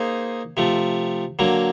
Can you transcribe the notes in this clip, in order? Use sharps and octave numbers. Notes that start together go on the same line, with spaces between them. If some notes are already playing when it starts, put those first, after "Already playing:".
Already playing: A#3 D#4 G#4 C5
C3 F3 A3
D3 F#3 A#3